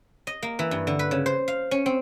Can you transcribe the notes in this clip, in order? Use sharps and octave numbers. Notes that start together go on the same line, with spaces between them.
D#5
A#3
E3
G2
D3
B4
C#3
C5
F5
C#4
C4